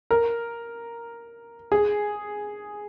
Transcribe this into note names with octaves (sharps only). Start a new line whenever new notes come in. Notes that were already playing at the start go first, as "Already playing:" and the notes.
A#4
G#4